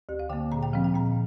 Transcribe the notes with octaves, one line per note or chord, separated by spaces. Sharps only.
D2 G4
F5
D3 A#3 G5
A#2 A#5
G5
F3 C4 F5
G5
A#2 A#5